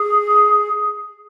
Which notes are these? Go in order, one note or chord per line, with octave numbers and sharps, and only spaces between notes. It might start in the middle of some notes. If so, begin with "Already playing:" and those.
Already playing: G#4